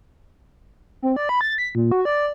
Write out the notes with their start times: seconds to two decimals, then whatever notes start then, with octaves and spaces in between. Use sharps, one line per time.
1.02 C4
1.16 D5
1.29 B5
1.41 A6
1.58 B6
1.75 A#2
1.91 F#4
2.05 D5